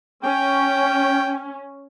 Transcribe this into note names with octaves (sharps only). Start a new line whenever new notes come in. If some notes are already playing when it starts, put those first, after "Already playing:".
C#4 G5